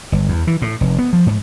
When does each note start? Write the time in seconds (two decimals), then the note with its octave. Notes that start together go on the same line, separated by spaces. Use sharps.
0.12 G1
0.29 E2
0.47 E3
0.62 A2
0.81 F1
0.98 B3
1.13 F3
1.27 G#2